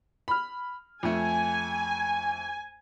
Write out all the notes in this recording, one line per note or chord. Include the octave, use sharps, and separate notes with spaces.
B5 F6
F2 A3 G#5